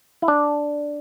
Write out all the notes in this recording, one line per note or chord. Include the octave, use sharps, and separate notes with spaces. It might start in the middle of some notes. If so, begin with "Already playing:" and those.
E4
D4